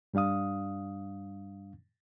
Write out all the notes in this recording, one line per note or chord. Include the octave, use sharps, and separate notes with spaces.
G2 G3 D4 F5 D#6